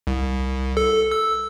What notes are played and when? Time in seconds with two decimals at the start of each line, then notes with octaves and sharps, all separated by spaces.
0.07 C2
0.77 A4
1.12 E6